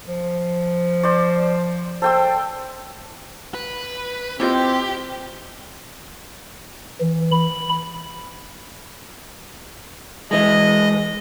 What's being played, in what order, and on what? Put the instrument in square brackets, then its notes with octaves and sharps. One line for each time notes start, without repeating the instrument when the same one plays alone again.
[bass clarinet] F3
[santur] C5 D5
[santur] A4 G5 E6 [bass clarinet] C5
[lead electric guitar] B4
[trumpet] C4 [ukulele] E4 F4 D#5 [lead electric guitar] G4
[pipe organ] E3
B5
[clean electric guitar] E3 G#3 [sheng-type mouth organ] D#5